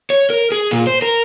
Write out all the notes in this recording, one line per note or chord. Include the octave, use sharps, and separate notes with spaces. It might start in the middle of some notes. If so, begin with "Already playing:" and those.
C#5
A#4
G#4
A#2
C5
A#4